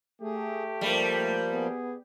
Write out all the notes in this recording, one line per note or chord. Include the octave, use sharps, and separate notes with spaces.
A3 G4 G#4
F3 G3 A#3
B3 G#4